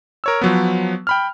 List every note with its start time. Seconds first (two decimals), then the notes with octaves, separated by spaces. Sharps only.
0.24 A#4 C#5 E6
0.41 F3 F#3 B3
1.07 G5 B5 F6